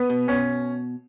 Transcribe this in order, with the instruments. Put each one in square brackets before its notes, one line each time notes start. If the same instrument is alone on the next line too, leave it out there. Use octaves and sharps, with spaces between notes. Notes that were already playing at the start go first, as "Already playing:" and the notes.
Already playing: [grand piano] B3
[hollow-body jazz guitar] B2
[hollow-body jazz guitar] B2 [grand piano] C#4